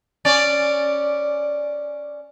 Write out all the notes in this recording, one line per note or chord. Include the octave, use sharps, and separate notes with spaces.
C#4 D5